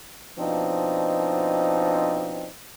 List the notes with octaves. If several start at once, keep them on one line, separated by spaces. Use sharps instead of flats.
B2 F3 C4 D4 D#4